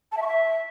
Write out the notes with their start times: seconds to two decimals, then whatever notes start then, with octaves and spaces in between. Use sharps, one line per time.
0.12 A5
0.17 E5
0.22 C#6
0.27 E5